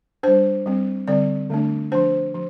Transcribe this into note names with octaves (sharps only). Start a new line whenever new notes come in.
G3 D4 C5
G3 C4
D3 G3 C4 D5
D3 A3 D4
F3 D4 C5
F3